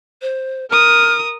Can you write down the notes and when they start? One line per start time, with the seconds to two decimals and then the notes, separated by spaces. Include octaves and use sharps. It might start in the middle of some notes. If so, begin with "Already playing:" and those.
0.22 C5
0.70 A#4 D#6 F6